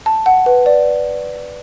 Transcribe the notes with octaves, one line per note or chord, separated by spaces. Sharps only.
A5
F#5
B4
D5